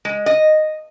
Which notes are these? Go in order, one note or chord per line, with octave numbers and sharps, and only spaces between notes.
G#3
D#5